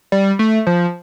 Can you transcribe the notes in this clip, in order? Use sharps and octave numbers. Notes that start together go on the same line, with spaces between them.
G3
A3
F3